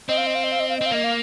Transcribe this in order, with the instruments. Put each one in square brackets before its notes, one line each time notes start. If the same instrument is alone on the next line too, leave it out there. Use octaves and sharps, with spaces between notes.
[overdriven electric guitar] C4 [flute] D#5
[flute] F5
D#5
F5
D#5
F5
D#5
F5
D#5
[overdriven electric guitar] C4 [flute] F5
[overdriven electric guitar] A#3 [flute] D#5
[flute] F5